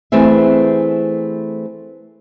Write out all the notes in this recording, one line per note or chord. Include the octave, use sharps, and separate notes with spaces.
E3 A3 B3 C4 G#4 E5